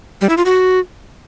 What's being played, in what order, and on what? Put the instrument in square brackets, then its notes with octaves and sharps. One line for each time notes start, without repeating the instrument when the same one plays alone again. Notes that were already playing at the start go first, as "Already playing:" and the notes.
[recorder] G3
E4
F4
F#4